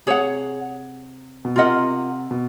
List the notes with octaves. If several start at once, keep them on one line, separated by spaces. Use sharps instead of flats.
C3 G#4 C#5 F#5
B2
C3 F4 A#4 D#5 F#5
B2